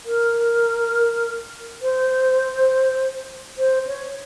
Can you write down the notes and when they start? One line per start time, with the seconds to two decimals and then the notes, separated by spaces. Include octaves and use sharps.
0.05 A#4
1.82 C5
3.58 C5
3.87 C#5